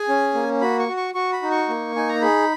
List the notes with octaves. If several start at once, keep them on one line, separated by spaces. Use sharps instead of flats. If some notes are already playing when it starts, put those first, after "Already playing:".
Already playing: G#4 G#5
C#4
A#3
F#4 B5
C#6
F#4
C#6
F#4 C#6
B5
D#4
C#6
A#3
D#4 G#5
A#5
G#4 B5